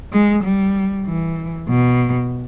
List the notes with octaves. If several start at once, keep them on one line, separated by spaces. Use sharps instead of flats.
G#3
G3
E3
B2